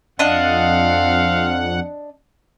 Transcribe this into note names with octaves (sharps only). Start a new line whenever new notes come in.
F2 C4 D4 D#5 F5 F#5